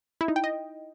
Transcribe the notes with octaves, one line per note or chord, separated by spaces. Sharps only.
E4
D#4
G5
D#5